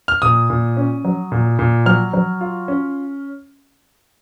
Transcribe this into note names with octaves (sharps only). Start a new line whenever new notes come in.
F6
A#2 D#6
A#2
C#4
F#3
A#2
A#2
F#3 F6
F#3
F4
C#4